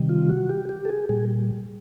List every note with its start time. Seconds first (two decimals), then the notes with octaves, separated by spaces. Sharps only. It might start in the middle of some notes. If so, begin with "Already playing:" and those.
Already playing: C3 D#3 G3
0.09 F4
0.29 F#4
0.49 G4
0.69 G4
0.85 A4
0.89 G#4
1.09 A#2 G3 G#4